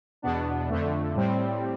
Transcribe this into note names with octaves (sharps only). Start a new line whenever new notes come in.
E2 B2 B3 D4
F2 D3 A3
A2 G3 C4